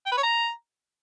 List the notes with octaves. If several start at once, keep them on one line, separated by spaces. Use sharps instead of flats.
G5
B4
C#5
A#5